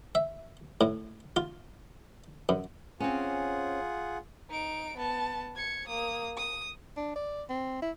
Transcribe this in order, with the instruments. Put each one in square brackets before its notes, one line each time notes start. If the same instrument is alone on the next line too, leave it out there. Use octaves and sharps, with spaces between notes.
[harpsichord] E5
A2
F4
F#2
[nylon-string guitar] C4 C#4 [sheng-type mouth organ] F4 G#4 F#5
[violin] D#4 D7
B3 A5
G#6 C#7
A#3 D#6
D#6
[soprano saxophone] D4
D5
C4
E4